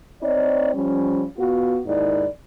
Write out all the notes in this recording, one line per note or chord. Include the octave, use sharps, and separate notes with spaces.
C4 D#4 C#5 D5
F3 G3 C#4
B3 F4 F#4
D#2 G#2 D#3 E4 D5